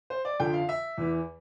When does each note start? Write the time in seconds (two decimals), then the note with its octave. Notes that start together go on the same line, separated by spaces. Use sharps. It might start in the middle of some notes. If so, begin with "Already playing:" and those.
0.10 C5
0.25 D5
0.40 F2 D3 F3 G5
0.54 F5
0.69 E5
0.98 E2 E3